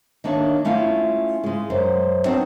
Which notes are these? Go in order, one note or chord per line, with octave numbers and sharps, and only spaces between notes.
D#3 A#3 D4 C#5 E5
A3 C#4 E4 F4 F5
C#3 G#3
F#2 C5
F#3 B3 C4 D4 D#4 F#4